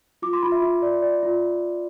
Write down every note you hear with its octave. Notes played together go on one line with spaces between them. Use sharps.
F4 D6
C6
F4 B5
E5
F4
D5
D5
F4